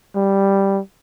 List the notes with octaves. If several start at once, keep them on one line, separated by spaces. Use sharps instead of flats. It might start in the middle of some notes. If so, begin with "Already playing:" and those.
G3